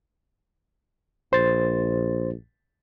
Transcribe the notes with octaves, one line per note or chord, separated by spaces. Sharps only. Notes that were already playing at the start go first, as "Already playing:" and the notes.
A#1 C5 A6